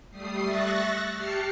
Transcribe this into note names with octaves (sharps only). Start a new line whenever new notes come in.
G3 A3 D#6 C7
E5 C#6 F#6 A6 A#6
G4 A5 F6 C7 C#7